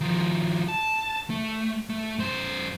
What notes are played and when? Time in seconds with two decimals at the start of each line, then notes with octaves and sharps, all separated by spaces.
0.01 D#3 F3
0.68 A5
1.30 A3
1.90 A3
2.18 F#2 C5